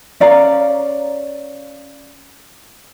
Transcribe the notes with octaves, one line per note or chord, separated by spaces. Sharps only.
C#4 D5 F5 A#5